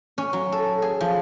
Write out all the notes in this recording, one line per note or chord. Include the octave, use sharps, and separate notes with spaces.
C#4
F#3
A4
G#4
F3